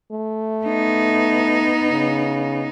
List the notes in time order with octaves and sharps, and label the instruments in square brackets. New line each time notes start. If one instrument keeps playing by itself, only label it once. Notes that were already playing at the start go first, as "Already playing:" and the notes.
[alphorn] A3
[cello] B3 D#4
[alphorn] C#3